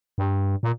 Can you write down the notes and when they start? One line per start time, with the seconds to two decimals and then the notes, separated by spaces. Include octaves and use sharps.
0.18 G2
0.63 A#2